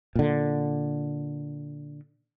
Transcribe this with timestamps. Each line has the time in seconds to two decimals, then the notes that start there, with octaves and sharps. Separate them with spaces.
0.15 A#2 D3